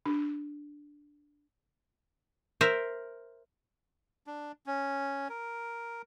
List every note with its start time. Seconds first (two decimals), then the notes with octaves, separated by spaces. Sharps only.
0.06 D4
2.61 A#4 C5 E5
4.27 D4
4.66 C#4
5.29 A#4